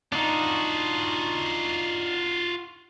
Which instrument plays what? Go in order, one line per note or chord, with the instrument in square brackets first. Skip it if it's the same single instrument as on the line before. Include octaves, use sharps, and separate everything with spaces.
[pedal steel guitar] D4 D#4 [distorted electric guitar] F4 F#4